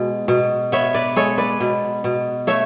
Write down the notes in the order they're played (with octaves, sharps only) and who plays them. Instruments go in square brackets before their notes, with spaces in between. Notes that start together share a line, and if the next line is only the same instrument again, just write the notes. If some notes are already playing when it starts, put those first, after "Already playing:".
Already playing: [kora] B2 G#3
B2
B3 C#5 E5
B4 D5
G#3 A4 C#5
B4 D5
B2
B2
A3 C#5 E5